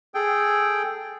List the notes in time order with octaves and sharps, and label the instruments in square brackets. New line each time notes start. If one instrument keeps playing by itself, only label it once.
[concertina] G#4 A4 G5